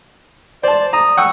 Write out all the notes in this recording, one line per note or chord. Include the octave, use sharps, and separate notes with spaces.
C5 D5 A5
A#5 D#6
F#5 G5 C#6 E6